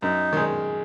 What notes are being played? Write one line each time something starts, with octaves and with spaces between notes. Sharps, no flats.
F#2 D#4
D#3 G#3